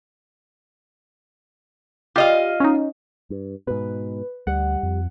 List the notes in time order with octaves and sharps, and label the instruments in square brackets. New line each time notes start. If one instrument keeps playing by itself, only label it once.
[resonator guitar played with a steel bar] F4 D#5 F5 [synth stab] G4
[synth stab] C#4 D#4
[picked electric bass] G2
[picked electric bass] G#2 B2 [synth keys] B4
[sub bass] D2 [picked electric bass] G3 [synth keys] F#5
[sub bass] F2